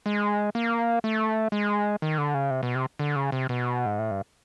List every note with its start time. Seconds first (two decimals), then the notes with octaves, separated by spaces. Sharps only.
0.06 G#3
0.55 A#3
1.04 A3
1.52 G#3
2.02 D#3
2.18 D3
2.34 C#3
2.50 C3
2.63 B2
2.75 C3
2.99 D3
3.16 C#3
3.32 C3
3.49 B2
3.86 G#2
3.99 A2
4.11 G2